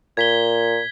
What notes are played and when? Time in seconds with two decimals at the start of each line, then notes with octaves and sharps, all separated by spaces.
0.17 A#2 G#6 B6 G7